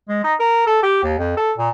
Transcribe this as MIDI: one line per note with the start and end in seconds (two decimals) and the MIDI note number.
0.09 0.22 56
0.24 0.34 63
0.39 0.66 70
0.67 0.80 69
0.83 0.99 67
1.03 1.16 39
1.18 1.33 41
1.37 1.52 69
1.57 1.69 46